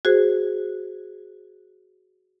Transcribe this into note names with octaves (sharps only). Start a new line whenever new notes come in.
F#4 G#4 C5